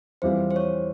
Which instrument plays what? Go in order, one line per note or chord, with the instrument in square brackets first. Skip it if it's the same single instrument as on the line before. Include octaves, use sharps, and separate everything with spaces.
[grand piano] E2 E3 G3 C4 F4 [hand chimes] C5
[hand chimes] C5
C#5